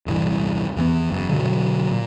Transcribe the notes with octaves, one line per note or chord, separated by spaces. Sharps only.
D#1 C2 G2 E3
E2 E3 B3
F#1 F#2
B2 D3 F3 F#3
A#2